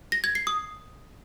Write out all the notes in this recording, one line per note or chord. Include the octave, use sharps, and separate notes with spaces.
A#6
G#6
C7
D#6